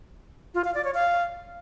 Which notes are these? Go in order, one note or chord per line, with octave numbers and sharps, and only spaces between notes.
F4
F5
D5
C#5
F5